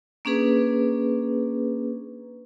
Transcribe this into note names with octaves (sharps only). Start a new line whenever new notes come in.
A#3 C#4 D4 G#4 B4